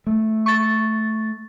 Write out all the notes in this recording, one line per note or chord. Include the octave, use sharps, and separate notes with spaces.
A3
C#6 A6